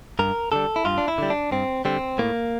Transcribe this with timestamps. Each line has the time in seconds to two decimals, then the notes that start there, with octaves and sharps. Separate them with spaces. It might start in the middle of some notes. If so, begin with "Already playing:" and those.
0.19 G2 A#4
0.52 D3 G3 A4
0.76 E4
0.85 G2 F4
0.98 D4
1.08 E4
1.18 D3 G3
1.30 D4
1.51 G2 C4
1.85 D3 G3 C4
2.19 A2 A#3